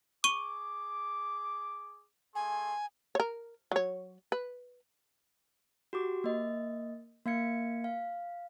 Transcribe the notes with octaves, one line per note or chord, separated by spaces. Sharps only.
G#4 C#6 D6 D#7 G7
A3 G#4 G#5 C6
A#4 C#5
F#3 C#5
B4
F#4 G4 D6
A#3 D#5
A#3 F5 G#6 C#7
F5